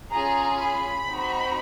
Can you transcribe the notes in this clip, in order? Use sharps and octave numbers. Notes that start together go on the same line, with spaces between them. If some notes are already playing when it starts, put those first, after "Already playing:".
C#4 F4 G#4 A#5
B5
C4 D#4 F#4